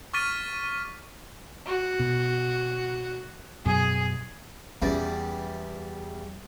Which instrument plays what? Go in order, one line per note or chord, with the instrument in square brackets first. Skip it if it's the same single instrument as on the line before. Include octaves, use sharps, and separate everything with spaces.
[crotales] C#6 D6 F6 A6 B6 D#7
[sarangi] F#4
[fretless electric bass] B2
[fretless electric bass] F#2 B2 [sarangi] G#4
[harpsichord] E2 G3 [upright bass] C#4 F4